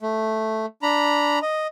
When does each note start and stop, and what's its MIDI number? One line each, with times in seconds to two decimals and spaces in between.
0.01 0.66 57
0.82 1.39 62
0.82 1.39 82
0.82 1.39 83
1.42 1.67 75